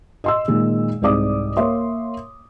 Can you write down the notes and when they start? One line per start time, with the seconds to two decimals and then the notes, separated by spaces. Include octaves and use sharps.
0.24 D#5 C6 E6
0.48 A#2 D#3 G#3
1.02 C2 G#2 D5 D6 D#6
1.57 A#3 C#5 E5 C6